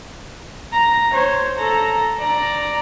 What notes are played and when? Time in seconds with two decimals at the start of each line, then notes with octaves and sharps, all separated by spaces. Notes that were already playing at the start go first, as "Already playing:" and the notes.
0.72 A#5
1.14 C5 C#5
1.58 A4 A#5
2.19 D5 A#5